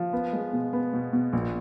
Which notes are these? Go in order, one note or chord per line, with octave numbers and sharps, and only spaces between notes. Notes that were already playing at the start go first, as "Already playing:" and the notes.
Already playing: F3
B3
G#3
B2
B3
B2
B2
A#1